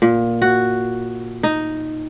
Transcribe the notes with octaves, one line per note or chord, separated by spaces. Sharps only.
A#2
F#4
D#4